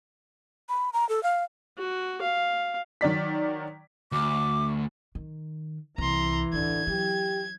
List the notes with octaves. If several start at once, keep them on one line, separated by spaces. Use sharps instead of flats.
B5
A#5
A4
F5
F#4
F5
D#3 F#3 D5 B6
D2 D6
D#3
C2 E3 A#5 C6
A1 D2 D3 G#6
F#3 G4